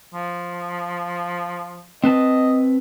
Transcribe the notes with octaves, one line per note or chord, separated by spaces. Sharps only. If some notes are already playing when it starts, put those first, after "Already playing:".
F3
C4 B4 D#5 A5